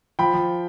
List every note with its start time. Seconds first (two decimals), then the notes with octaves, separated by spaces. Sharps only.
0.19 F3 G5 B5
0.34 F3